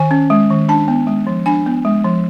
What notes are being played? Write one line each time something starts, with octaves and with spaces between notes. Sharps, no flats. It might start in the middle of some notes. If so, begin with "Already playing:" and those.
Already playing: D#3 G#5
C#4
G#3
D#3
D4 A5
B3
G#3
F3
D4 G#5
B3
G#3
F3